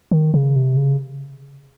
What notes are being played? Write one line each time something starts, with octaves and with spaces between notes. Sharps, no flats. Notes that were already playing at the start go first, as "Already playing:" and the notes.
D#3
C#3
C3
C#3